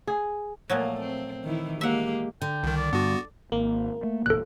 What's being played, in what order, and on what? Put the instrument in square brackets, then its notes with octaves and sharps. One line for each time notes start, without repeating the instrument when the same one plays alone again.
[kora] G#4
[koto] A#2 F3 F#3 [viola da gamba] A3 A#3
[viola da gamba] C4
D#3 E3 E4
[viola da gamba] G#3 A#3 G4 [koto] E5 F#5
[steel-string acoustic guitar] D3 [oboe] G5
[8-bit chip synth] C2 D#3
[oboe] D5
[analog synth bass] G2 [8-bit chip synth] B3 F#4
[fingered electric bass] G#1 [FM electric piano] A#3
[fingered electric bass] A3
[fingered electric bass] F#1 E2 A#2 [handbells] A4 F#6